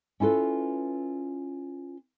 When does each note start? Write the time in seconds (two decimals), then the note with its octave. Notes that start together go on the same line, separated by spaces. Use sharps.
0.20 C#4 E4 F4 A4 B4